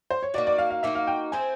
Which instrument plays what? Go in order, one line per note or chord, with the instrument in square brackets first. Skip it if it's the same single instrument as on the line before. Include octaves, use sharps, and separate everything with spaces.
[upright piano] C5
C#5
[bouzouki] A#3 D#4 F#4 [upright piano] D5
[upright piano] D5
F5
F5
[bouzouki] A#3 D#4 F#4 [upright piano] E5
[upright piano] F5
G5
[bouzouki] C4 E4 G#4 C5 [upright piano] G#5